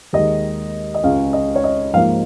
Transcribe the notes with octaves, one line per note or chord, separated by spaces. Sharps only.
D#2 D#3 G#3 D#5
D#5
C#2 C#3 G#3 C#4 F5
D#5
C#5
D#5
G#2 F3 A#3 F5